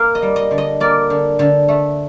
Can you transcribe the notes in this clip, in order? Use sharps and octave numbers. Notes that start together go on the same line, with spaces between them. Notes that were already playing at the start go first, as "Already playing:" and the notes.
Already playing: A#3 F5
D#5
G3
D#5
D3
D#5
A#3 D5
D3
D3
A3